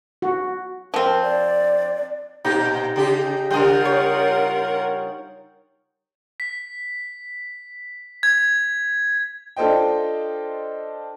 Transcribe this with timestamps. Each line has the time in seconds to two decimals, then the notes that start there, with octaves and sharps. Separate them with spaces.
0.22 F#4
0.94 F3 C4 A#4
1.23 D5
2.44 A#2 D#4 G4 A#5
2.96 C#3 G4 G#4
3.51 C#3 G3 F4 A#4 F#5 G5 D#6
3.85 C#5
6.40 B6
8.23 G#6
9.56 D4 F4 A4 C5 D#5 G5